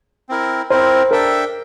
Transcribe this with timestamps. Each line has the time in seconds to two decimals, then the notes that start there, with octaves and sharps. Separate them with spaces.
0.29 C4 E4 A#4
0.70 C4 E4 A#4 C5
1.11 D4 A4 A#4 E5 G5